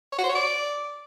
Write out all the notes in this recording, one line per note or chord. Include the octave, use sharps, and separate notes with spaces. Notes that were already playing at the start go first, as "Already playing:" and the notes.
C#5
F#4
C5
C#5
D5